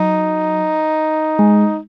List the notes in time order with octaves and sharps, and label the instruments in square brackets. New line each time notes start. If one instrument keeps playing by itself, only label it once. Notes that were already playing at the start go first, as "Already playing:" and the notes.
Already playing: [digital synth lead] F#3 [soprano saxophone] D#4
[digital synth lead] G#3